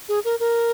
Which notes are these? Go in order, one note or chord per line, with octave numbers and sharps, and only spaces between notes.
G#4
A#4
A#4